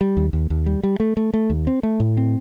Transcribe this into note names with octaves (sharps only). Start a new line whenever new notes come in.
G3
D#2
D#2
D#2
G3
G3
A3
A3
A3
D#2
C4
A3
A2
C4